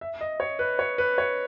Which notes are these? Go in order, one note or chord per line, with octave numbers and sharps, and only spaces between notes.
E5
D#5
C#5
B4
C#5
B4
C#5